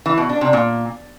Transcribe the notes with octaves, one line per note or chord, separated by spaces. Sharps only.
E3
B2
D4
C3
A#2